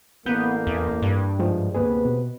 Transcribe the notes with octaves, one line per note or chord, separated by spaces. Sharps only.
A1 A#3 B3 G6
E2
G2
G#2 F3 G#3
D2 C3 A#3 B3 G#4 B4
B2